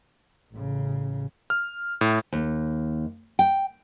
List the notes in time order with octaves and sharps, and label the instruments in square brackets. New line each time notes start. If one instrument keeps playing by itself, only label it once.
[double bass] A1 C#3
[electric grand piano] F6
A2
[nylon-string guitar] D#2
G5